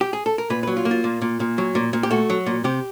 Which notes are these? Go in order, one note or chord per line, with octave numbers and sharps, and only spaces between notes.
G4
G#4
A4
A#4
A#2 B4
F#3 B4
F4
A#3
F4
A#2
A#2
A#2
F#3
A#2
A#2
G4
A3 F#4
F#3
A#2
C3 G4